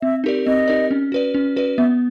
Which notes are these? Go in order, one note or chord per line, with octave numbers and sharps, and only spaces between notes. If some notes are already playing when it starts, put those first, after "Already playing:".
C4 E5
D#4 G4 A#4 D5
C4 D#5
D#4 G4 A#4 D5
C#4
F#4 B4 D5
C#4
F#4 B4 D5
B3 E5